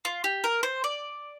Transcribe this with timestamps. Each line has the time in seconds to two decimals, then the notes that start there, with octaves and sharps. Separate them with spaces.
0.05 F4
0.24 G4
0.44 A#4
0.63 C5
0.84 D5